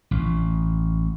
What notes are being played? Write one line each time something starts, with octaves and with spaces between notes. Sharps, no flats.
A1